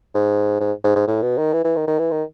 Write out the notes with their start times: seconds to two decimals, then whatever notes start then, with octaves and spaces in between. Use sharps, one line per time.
0.15 G#2
0.60 G#2
0.84 G#2
0.95 G#2
1.07 A2
1.22 B2
1.38 D#3
1.53 E3
1.64 E3
1.77 D#3
1.87 D#3
1.99 E3
2.11 D#3